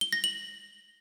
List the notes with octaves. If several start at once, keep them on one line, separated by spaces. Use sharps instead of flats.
G7
A#6
F#7